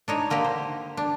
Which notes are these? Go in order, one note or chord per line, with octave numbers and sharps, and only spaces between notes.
D4 D#4 C#5
D3 A#3 D#4 G4
C5
D4